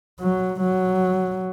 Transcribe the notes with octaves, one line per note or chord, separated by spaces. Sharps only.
F#3
F#3